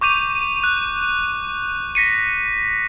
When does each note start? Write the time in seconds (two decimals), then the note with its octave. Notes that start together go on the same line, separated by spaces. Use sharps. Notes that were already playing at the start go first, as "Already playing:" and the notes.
0.01 C#6 D6 G6 D#7 F7
0.64 F#6
1.95 A#6 B6 C#7 D#7